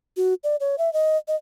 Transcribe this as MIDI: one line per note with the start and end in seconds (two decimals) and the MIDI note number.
0.17 0.34 66
0.44 0.56 74
0.60 0.76 73
0.78 0.92 76
0.93 1.17 75
1.28 1.35 75